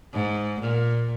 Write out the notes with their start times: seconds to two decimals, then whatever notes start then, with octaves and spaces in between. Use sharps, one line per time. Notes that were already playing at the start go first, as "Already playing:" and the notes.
0.13 G#2
0.60 A#2